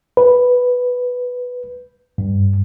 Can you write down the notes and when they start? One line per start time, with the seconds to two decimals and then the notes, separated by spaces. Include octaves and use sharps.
0.17 B4
2.18 G2